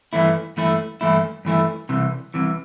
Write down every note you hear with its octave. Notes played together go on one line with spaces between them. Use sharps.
G2 E3 A3 E4
G2 E3 A3 E4
G2 E3 A3 E4
G2 E3 A3 E4
C2 C3 E3
C2 C3 E3